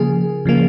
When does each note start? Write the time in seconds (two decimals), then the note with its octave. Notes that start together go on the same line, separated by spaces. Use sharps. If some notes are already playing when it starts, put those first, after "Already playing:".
Already playing: C#3 F3 A#3 G#4
0.45 C#3 F3 A#3